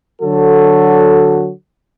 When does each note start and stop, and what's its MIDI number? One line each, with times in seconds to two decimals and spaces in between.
0.22 1.49 50
0.22 1.49 54
0.22 1.49 66
0.22 1.49 69